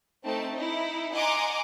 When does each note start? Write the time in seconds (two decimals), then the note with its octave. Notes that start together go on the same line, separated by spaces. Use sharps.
0.24 A3 C4 D#4 A5
0.55 D#4 E4
1.12 D#5 F#5 G#5 A#5 C6 D6